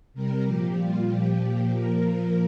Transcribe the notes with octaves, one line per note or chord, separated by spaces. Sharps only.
C3 G3 A#4
A#2 F3 G4
A#2 G3 F4
A#2 F3 G4
A#2 F3 G4
A#2 F3 A#4
A#2 F3